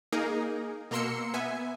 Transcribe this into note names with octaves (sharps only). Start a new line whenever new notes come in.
A#3 D#4 G#4 A#4
B2 A#3 A#4 C6 E6 C#7
B3 E5 G#5